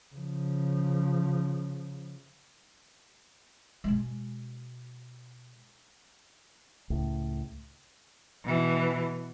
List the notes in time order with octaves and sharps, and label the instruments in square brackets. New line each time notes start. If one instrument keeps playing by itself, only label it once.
[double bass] C#3 F3
[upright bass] B2 G#3
[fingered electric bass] C#2 A2
[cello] B2 E3